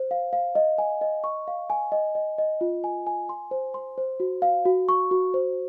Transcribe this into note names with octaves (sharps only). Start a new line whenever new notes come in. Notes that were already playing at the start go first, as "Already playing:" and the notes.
Already playing: C5
F5
F5
D#5
G#5
D#5
C#6
F5
G#5
D#5
D#5
D#5
F4
G#5
G#5
C6
C5
C6
C5
F#4
F5
F#4
C#6
F#4
C5